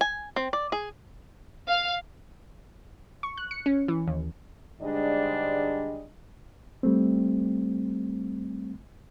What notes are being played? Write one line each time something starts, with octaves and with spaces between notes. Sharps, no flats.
G#5
C4
D5
G#4
F5
C#6
F#6
C#7
C#4
E3
D#2
G#2 D3 G3 G#3 D4 D#5
G3 A3 C4